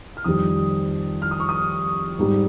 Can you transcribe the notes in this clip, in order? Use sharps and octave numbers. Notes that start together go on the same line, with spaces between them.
F6
F2 D#3 G3 D#6
F6
D#6
C#6
D#6
G#2 G3